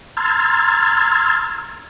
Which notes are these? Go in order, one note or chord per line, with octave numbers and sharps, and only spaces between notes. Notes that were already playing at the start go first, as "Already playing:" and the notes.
A#5 C6 E6 F6 G#6 A6